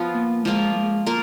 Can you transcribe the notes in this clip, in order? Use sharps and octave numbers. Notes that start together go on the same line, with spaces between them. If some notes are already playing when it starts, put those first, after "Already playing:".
Already playing: F3 B3 F4
A#3
F3 G#3 A#3 F4
G#3
A#3 F4 A#4